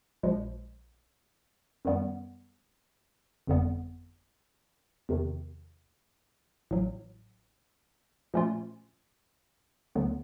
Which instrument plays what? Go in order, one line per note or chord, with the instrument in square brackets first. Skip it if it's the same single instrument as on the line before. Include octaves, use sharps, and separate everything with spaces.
[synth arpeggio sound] A#1 A#2 F3 G#3
F#2 D#3 G3 B3
G1 F2 D3 G3 B3
E2 C3 D#3
A1 A2 F#3
A#2 F3 A3 C#4 F4
D2 D3 F#3 B3